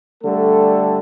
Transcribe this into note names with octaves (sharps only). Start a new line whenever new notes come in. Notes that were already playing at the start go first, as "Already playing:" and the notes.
D3 G3 A3 A4